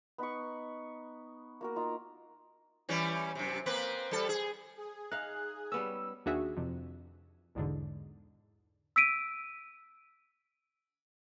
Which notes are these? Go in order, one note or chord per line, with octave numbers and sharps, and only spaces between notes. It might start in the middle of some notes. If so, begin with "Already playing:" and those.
B3 D#4 B5 C#6
A#3 F#4 A#4
D#4 F4 A#5
E3 G3 C#4
F#2 C3
A#3 C4 B4
G3 A4
G#4
G#4
D#4 F5 F#6
G3 B3 C#4 E6
D#2 D4 F#4 G#4 E5
F2 C3
B1 E2 G#2 D3
E6 B6 D7 D#7